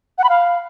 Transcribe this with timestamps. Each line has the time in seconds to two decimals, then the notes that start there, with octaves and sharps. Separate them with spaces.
0.18 F#5
0.24 B5
0.29 F5